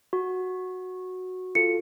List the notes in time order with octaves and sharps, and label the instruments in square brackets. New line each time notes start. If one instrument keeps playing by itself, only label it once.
[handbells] F#4
[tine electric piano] F4 A4 [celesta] C#7